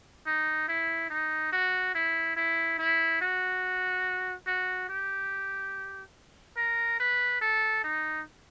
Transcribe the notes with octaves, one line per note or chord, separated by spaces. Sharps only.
D#4
E4
D#4
F#4
E4
E4
E4
F#4
F#4
G4
A#4
B4
A4
D#4